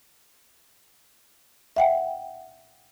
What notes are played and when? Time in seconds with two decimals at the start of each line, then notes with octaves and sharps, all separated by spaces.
1.76 E5 F#5 G5